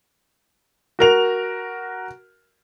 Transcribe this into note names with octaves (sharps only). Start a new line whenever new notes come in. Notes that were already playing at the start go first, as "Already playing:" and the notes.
F#4 A#4 F7